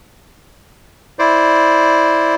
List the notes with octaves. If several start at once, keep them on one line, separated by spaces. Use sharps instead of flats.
E4 C5 D5